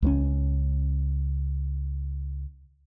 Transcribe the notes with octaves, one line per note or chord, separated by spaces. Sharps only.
C#2 F3 C#4